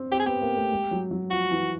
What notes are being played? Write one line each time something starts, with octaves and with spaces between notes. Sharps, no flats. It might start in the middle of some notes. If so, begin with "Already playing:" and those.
Already playing: C4
C4 G4
G#4
B3 G4
A#3
A3
G#3
F#3
F#3
F3 F#4
E3